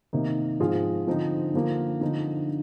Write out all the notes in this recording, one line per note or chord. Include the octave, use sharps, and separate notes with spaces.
C3 D#3 A#3 D#4
G#2 F3 C4 F4 G#4
D3 F3 C4 D#4
D3 F3 A#3 F4
D3 F3 C4 D#4